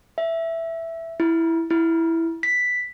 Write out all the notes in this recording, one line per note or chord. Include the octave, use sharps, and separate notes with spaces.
E5
E4
E4
B6